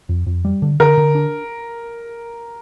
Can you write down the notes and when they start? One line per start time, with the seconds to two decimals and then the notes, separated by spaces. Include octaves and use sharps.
0.09 F2
0.27 F2
0.45 G3
0.62 D3
0.80 D3 A#4
0.98 D3
1.15 D4